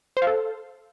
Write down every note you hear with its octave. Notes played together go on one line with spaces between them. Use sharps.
C5
F5
A4